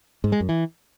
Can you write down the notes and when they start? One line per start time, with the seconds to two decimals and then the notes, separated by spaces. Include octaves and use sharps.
0.24 G#2
0.32 G#3
0.40 F#2
0.49 E3